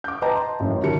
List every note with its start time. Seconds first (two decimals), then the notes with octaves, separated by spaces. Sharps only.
0.04 D6 G6
0.22 B4 D#5 G5 A5 A#5 G6
0.35 C6
0.60 A1 F#2 A2
0.83 D#3 G3 A5 C#7